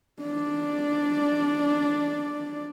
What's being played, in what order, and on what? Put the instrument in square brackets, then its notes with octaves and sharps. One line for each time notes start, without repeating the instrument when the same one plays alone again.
[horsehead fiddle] D4 D5